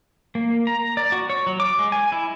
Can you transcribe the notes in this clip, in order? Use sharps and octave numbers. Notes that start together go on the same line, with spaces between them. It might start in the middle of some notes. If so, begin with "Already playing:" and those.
A#3
A#5
D5
F#4
C#5
F#3
D6
G#3
G#5
E4